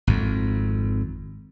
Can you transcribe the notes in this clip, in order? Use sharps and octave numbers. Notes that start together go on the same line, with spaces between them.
G#1 F2